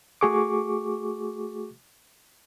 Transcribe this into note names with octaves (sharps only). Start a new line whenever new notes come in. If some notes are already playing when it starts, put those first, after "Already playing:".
A3 F#4 G#4 C#6 D6